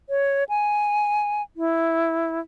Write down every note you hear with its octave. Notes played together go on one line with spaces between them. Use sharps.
C#5
G#5
E4